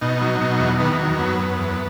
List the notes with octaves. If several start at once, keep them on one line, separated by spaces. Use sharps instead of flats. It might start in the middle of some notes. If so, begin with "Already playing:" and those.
B2 D#4
F#3
B2
E2
D#3 B3
F#3
F#2 B3
F#2
E2